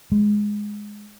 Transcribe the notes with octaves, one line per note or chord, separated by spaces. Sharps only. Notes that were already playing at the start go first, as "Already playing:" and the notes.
G#3